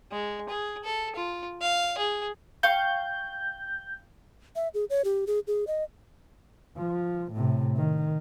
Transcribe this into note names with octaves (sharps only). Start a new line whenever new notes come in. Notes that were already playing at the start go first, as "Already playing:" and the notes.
G#3
G#4
A4
F4
F5
G#4
F5 G5 C#6 G6
E5
G#4
C#5
G4
G#4
G#4
D#5
F3
A2 C3
D#3